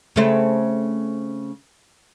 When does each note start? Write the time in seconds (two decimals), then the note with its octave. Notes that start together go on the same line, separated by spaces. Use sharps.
0.16 C#3 A3 C4